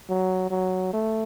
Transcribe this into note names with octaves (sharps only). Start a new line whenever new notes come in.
F#3
F#3
A3